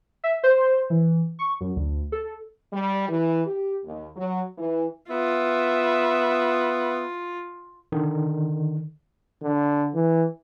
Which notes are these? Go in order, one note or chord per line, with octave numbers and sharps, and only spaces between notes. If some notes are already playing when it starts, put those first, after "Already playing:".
E5
C5
E3
C#6
F#2
D2
A4
G3
E3
G4
D#2
F#3
E3
B3 F4 E5
D3 D#3
D3
E3